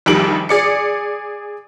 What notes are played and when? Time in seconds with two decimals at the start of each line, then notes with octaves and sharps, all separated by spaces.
0.06 A#1 F2 D#3 G3 D7 F#7
0.49 G#4 D5 C#7